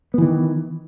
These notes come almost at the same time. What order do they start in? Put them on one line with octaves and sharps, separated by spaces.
B3 E3 D#3